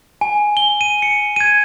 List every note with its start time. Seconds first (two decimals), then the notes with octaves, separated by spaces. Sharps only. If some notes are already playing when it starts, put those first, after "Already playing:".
0.21 G#5
0.57 G7
0.81 D#7
1.02 C#7
1.36 G#6 D#7